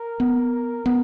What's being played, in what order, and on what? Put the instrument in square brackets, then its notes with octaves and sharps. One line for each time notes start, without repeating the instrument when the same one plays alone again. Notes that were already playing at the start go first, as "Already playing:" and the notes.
Already playing: [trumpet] A#4
[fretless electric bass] B3
B3